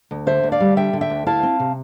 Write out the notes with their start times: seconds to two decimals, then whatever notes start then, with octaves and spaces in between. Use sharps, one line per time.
0.11 D2
0.27 D3 C5 E5
0.43 D2
0.52 D5 F5
0.60 G3
0.77 D3 E5 G5
0.93 D3
1.01 E5 G5
1.10 D2
1.27 E4 F5 A5
1.43 C4
1.60 C3